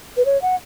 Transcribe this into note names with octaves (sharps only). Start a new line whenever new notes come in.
B4
C#5
F#5